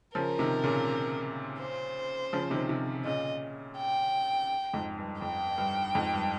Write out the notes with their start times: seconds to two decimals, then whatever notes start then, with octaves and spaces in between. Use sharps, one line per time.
0.15 C#3 F3 A#4
0.39 C3 D#3
0.63 A#2 C#3
1.60 C5
2.33 C#3 F3
2.51 C3 D#3
2.69 C3 D#3
3.05 A#2 C#3 D#5
3.78 G5
4.74 F2 G#2
4.99 G2
5.22 F2 G5
5.58 G2
5.95 F2 G#2
6.13 G2